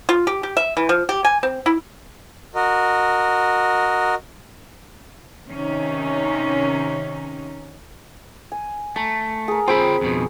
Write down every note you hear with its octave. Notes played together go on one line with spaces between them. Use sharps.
F4
G4
G4
E5
E3
F3
G4
G#5
C4
E4
F#4 A#4 D#5
C3 D#3 C#4 D#4
G#5
A3 A5 A#5
G#4 A#4
C4 F4 G#4 G5 B5
F2 B2